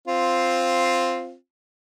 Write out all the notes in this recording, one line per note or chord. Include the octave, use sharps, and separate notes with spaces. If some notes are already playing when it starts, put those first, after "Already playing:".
C4 F4